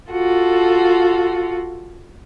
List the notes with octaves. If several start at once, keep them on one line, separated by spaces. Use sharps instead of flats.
F4 F#4 A4